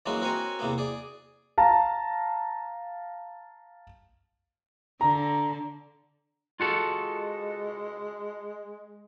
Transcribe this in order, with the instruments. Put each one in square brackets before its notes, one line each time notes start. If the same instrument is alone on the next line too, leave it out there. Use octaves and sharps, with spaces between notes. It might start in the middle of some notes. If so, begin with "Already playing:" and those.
[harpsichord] E3 F#3 G#3 A#3 C#4 F#4
C4 F#4 A#4 C5 C#5 G#5
E2 C3 A#3 B3
G#4 D5
[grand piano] F5 A5 A#5
[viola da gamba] D3 [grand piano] A#5
[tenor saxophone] G#3 [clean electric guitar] F4 F#4 A4